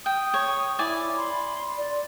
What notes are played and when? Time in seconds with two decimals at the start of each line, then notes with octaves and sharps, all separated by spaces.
0.06 G5 D#6
0.34 C#5
0.79 E4 D5 G#5
1.16 B5 C6
1.77 D5